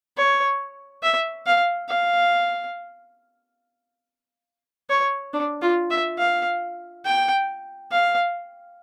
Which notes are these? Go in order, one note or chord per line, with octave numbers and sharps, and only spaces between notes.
C#5
E5
F5
F5
C#5
D4
F4
E5
F5
G5
F5